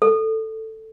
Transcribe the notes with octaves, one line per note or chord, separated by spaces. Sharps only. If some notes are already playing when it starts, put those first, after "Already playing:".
A4